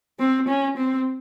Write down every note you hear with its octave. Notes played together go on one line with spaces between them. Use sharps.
C4
C#4
C4